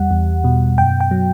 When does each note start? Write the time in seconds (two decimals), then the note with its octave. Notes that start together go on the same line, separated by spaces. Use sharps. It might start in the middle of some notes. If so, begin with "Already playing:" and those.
Already playing: E2 G3 F#5
0.11 E2
0.44 B2
0.78 F#2 G5
1.00 G5
1.11 F#3